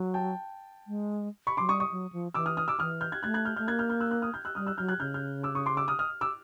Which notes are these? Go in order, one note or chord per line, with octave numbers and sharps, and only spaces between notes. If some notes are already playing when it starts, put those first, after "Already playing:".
Already playing: F#3
G5 A5
G#3
B5 C#6
F#3 C6 D6
G3 C#6 D#6
C#6 D#6
F#3
F3
E3 D6 E6
D#6 F6
D#6 F6
D6 E6
E3 D#6 F6
F6 G6
F#6 G#6
A3 F#6 G#6
F#6 G#6
F6 G6
A3 F6 G6
A#3 F#6 G#6
F6 G6
F6 G6
E6 F#6
E6 F#6
D#6 F6
F6 G6
E6 F#6
G3 D#6 F6
E6 F#6
F#3 F6 G6
F#6 G#6
C#3 F6 G6
F6 G6
D6 E6
C#6 D#6
C6 D6
D6 E6
D#6 F6
D#6 F6
D6 E6